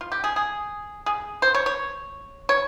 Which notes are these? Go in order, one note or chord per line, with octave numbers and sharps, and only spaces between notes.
F4
G4
G#4
G#4
G#4
C5
C#5
C#5
C#5